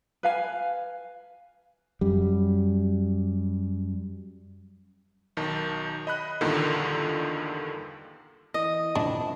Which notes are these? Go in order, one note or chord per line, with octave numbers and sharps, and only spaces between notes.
B4 F5 G#5
F#2 G3
B1 D#3 A5
D#5 B5 F#6
E2 G2 A#2 D3 D#3
E3 D#5
D#1 A#1 C3 D4 E4